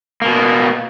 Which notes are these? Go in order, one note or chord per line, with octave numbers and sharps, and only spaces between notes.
B2 A#3